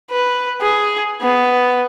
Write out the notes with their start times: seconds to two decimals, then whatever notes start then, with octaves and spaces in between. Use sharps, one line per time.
0.11 B4
0.61 G#4
1.21 B3